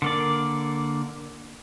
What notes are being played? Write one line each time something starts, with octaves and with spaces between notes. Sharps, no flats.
D3 A#3 D5